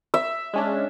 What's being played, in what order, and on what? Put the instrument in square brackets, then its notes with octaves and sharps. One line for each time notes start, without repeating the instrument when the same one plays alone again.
[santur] E5
[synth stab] G#3 C#4 D4